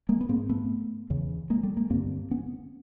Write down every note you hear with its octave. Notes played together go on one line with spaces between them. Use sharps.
G#3 A#3
B3
G#2 A#3 C4
A3 B3
E2 C#3
G#3 A#3
G3 A3
G#3 A#3
G2 D3 A#3 C4
B3 C#4